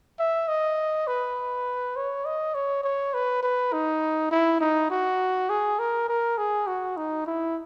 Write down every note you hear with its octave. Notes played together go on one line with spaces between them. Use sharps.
E5
D#5
B4
C#5
D#5
C#5
C#5
B4
B4
D#4
E4
D#4
F#4
G#4
A#4
A#4
G#4
F#4
D#4
E4